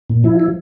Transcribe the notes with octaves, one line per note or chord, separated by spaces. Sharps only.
A#2
F3 E4
E4